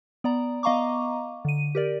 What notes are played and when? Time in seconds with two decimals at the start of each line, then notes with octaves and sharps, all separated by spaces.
0.24 B3 D5 A#5
0.63 B3 D#5 F5 A#5 C#6 D6
1.45 D3 D#7
1.75 G4 A#4 D5